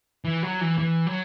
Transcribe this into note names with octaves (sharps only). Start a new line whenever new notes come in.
E3
F#3
E3
E3
F#3